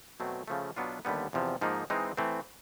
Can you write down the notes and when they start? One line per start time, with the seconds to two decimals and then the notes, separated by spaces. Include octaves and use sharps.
0.20 B2 F#3 A3 C4
0.48 C#3 F3 A3
0.76 B2 F#3 B3 D4 F4
1.05 D#2 D3 G3 B3
1.33 E2 C3 F3
1.61 G#2 F3 A#3 D#4
1.90 E3 G#3 C4 D#4
2.17 E3 A3 C4